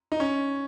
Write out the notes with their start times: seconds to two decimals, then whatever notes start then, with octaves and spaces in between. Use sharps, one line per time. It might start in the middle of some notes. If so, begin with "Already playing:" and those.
0.12 D#4
0.20 C#4